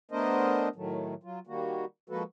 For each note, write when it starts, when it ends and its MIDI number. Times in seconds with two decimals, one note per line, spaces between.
0.11 0.69 57
0.11 0.69 59
0.11 0.69 62
0.11 0.69 70
0.11 0.69 72
0.11 0.69 75
0.76 1.14 45
0.76 1.14 51
0.76 1.14 54
0.76 1.14 57
1.23 1.39 54
1.23 1.39 65
1.47 1.85 51
1.47 1.85 55
1.47 1.85 58
1.47 1.85 66
2.10 2.23 53
2.10 2.23 56
2.10 2.23 58
2.10 2.23 66
2.10 2.23 69
2.10 2.23 71